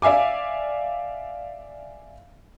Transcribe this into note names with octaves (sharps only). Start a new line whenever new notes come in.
D5 E5 F5 G#5 D6